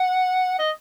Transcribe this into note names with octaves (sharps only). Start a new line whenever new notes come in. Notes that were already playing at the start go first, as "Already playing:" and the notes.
Already playing: F#5
D#5